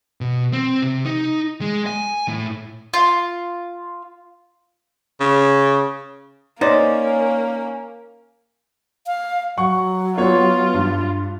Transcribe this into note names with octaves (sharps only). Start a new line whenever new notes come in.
B2
C4
C3
D#4
G#3
G#5
A2
F4
C#3
A#3 C#4 D#4 C5 D5
F5
F#3 F#5 C#6
B3 F4 C#5
G2